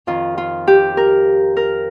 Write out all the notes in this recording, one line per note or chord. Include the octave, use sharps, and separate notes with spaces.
F2 D#3 F4
F4
G4
A#4
A#4